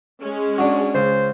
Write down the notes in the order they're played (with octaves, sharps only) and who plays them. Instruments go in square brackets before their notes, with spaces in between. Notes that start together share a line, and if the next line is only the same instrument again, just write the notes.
[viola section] G#3 C#4
[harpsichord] D4 F#4
[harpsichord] C#2 C#3 [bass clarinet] C5